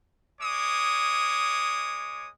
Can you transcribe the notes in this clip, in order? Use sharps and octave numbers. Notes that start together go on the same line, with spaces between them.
G#3 C#5 D6 D#6